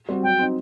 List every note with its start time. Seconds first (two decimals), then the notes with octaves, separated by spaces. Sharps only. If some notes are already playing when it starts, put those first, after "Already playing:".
0.09 G3 C4 F#4
0.23 F#3 G5
0.39 C4 D#4